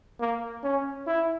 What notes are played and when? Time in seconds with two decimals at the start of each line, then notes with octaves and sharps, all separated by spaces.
0.20 A#3
0.63 C#4
1.07 E4